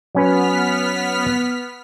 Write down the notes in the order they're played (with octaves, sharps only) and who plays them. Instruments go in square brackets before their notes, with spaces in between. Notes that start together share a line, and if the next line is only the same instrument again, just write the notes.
[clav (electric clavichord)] F#3 C#4 B4 [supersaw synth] B3 F6 B6